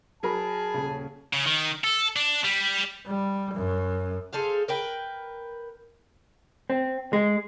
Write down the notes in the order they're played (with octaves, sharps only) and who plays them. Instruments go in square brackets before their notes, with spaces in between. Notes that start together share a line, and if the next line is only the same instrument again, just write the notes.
[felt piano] F#3 A#4 B5 [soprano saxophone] G#4 [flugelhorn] A5
[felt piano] D#1 C#3
[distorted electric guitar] C#3
D#3
A4
D4
G3
[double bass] G3
F#2
[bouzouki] G#4 A4 C5 F5
A#4 B4 G5
[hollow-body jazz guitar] C4
G#3